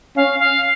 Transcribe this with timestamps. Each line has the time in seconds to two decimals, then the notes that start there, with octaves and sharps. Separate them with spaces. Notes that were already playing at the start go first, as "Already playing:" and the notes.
0.16 C#4 F5
0.40 F5